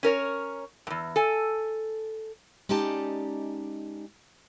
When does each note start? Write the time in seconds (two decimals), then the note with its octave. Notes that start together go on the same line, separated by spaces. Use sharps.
0.03 C#4 A#4 C#5
0.87 E2 G2
1.16 A4 G#5
2.69 G#3 C#4 D#4 G4 D5 A5